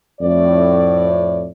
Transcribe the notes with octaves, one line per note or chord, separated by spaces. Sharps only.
F2 A2 D5